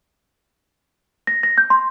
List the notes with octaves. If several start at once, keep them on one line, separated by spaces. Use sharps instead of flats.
A#6
A#6
G6
C6